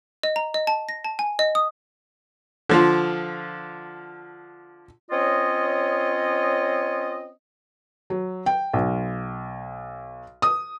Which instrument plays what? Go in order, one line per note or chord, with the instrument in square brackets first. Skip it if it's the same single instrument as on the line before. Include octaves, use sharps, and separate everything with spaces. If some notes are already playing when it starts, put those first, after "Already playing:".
[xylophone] D#5
A#5
D#5
A5
A#6
A5
G#5
D#5
D#6
[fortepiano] D3 F3 F4
[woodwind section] C4 C#4 F4 C#5 D#5
[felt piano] F#3
G5
B1
D#6